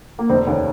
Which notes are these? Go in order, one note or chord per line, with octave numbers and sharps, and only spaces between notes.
A#3
F1 C4
D#2 C#4